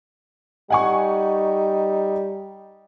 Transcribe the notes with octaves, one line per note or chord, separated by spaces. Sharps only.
G3 D#4 F#5 G#5 C#6